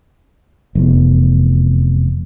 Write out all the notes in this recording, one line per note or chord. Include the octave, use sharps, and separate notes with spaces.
F1 E2